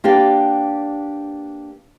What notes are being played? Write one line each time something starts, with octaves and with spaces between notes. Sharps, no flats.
A#3 D4 G4 B4 D5 G5